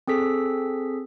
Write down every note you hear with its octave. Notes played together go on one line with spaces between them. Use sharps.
C4 G#4 A4 B6